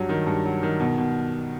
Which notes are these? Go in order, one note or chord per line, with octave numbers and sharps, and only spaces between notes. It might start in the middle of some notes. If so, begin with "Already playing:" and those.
Already playing: G2 F#3
D#3
G2
F#3
D#3
B2
B2